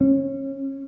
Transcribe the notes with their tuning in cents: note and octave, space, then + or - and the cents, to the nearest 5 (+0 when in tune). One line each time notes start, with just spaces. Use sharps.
C#4 -25